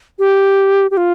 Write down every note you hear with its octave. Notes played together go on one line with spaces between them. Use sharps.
G4
G4
F4